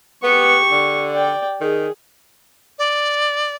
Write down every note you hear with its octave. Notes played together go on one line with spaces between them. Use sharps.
B3 G4 C#6
D3
D5 G5
D#3 G#4
D5